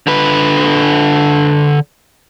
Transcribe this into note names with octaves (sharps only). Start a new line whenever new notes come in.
D3 B4